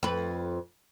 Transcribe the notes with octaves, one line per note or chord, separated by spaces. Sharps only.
F2 B4